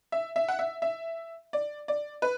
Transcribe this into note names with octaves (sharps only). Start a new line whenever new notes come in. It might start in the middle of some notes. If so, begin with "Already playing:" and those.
E5
E5
F#5
E5
E5
D5
D5
B4